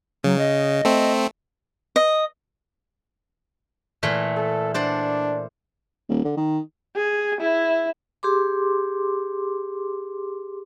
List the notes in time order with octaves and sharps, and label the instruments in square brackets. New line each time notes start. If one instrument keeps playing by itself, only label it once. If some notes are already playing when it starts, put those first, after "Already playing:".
[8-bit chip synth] C#3 [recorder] F#3
[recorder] D#5
[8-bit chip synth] A3 C4
[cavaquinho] D#5
[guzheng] A#2 E3 A3
[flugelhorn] A4
[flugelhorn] D4 [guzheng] C5 D5 F#5
[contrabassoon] D#1
D3
D#3
[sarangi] G#4
E4
[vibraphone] G4 G#4 C6 D6